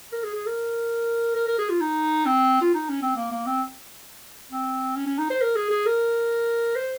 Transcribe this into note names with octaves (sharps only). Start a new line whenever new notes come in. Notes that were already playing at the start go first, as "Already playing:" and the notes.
A#4
G#4
G#4
A#4
A#4
A#4
G#4
F4
D#4
C4
F4
D#4
C#4
C4
A#3
A#3
C4
C4
C#4
C#4
D#4
C5
A#4
G#4
G#4
A#4
C5